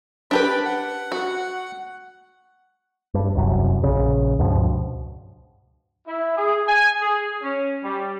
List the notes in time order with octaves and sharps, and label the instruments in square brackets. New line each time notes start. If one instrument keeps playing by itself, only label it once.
[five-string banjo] D4 G4 B4 [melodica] B5
[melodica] F#5
[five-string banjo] F#4
[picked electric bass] G2
E1 C2 F#2
A#1 C#3
C#2 G2 B2 F3
[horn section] E4
G#4
G#5
G#4
C#4
G3